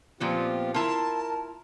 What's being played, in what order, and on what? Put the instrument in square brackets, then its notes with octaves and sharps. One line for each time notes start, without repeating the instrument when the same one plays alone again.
[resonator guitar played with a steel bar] A#2 F3 B3 [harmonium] C4 F4 G4
[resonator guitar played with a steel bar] E4 F4 [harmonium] A#4 [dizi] A5